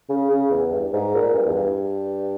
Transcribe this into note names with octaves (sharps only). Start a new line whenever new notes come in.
C#3
C#3
E2
G2
G#2
A#2
G2
E2
G2